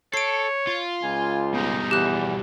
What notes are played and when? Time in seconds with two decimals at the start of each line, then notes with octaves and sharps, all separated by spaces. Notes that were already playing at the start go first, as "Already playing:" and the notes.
0.14 A4 C#5 C7 D7
0.67 F4
1.03 C#2 G#5
1.54 B2 G3 D#4
1.91 E2 G4 F#6